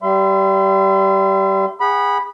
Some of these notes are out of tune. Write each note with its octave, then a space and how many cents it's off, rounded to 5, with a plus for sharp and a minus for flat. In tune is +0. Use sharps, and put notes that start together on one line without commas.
G3 -20 E5 +35 C6 -35
G#4 -30 F#5 +10 B5 -10